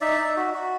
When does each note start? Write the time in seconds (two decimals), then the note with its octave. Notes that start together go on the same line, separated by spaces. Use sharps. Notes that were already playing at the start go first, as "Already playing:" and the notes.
0.01 D#4 D5 E5
0.19 D#4
0.37 F#4
0.54 F#4